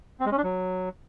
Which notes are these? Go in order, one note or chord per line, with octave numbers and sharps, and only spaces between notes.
C4
G#3
C#4
D4
F#3